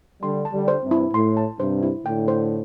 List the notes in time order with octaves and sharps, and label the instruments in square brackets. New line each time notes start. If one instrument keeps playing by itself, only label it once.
[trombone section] D3 G3 [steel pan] C6
[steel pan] A5
[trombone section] D3 G3
[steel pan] C5
[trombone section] G2 C3
[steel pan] E4
[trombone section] A2 [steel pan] C6
[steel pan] A5
[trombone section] G2 C3 [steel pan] C5
[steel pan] E4
[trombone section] A2 D3 [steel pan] G5
[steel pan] C5